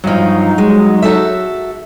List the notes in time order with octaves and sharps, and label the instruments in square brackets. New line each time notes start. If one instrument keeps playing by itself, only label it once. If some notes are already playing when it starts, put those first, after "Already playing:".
[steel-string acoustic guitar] G2 F3 [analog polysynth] F#3 D#4
[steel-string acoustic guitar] G#3
F#4 A4 E5